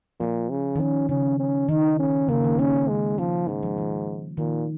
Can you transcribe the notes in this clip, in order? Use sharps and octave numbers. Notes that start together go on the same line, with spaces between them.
A#2 F3
C#3
D#3
F3 C#4
C#3 C#4
C#4
D#3 D#4
C#4
C#3 A#3
D#3
A#3 C#4
G#3
F3 C#4
G#2 G#3
F3
D#3
A#2 D#3